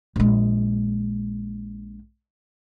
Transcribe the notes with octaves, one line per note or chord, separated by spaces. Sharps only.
A#1 G#3